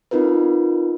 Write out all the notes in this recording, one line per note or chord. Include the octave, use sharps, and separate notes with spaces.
C4 D#4 F4 A#4 B4